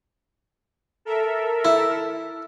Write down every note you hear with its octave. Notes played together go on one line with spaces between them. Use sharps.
A4 A#4 E5
E4